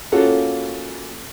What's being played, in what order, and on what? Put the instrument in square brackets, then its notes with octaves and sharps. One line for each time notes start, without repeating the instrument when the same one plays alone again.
[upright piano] A#3 C#4 F4 F#4 A4